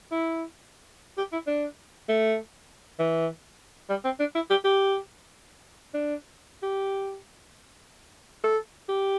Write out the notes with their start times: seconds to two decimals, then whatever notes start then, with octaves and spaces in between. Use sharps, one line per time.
0.11 E4
1.18 G4
1.33 E4
1.47 D4
2.09 A3
2.99 E3
3.90 G3
4.04 C4
4.19 D4
4.35 E4
4.50 G4
4.65 G4
5.94 D4
6.63 G4
8.44 A4
8.89 G4